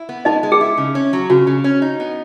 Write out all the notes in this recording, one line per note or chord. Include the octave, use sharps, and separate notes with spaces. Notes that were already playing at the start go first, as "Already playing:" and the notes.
Already playing: E4
B3
G#3 D#4 D#5
G#3
G#4
E4
C#3
C#4
F#3
C#3 F#4
C#3
C#4
D#4
B3